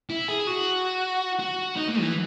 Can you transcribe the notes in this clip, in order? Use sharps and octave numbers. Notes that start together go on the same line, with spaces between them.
E4
G#4
F#4
F#4
D#4
A#3
E3